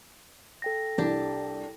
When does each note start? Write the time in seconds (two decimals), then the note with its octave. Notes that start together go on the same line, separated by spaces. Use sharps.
0.62 A4 G5 A#6
0.98 C2 D4 G4